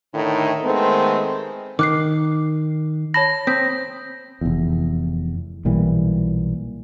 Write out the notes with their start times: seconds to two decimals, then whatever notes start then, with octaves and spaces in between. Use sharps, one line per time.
0.13 A2 D3 D#3 D#4
0.65 D#3 G#3 A3 B3 C4
1.79 D#3 D6 F#6 C7
3.14 C#5 A5 B5 A#6
3.47 C4 D#6 G6 B6
4.41 F1 E2
5.65 B1 A#2 E3 G3